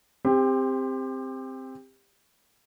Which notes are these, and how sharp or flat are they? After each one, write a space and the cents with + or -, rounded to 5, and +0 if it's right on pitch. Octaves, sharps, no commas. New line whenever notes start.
C4 +0 G4 +25